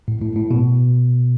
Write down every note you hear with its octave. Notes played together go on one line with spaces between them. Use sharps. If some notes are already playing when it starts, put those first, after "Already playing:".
A2
A2
A2
B2